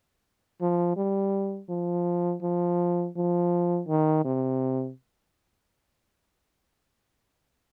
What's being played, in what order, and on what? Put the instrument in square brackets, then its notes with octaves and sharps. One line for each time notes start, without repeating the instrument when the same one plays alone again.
[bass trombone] F3
G3
F3
F3
F3
D#3
C3